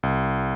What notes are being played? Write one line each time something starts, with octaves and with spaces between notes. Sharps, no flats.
C2